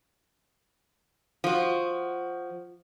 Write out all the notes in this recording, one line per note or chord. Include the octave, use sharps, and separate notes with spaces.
F3 F#4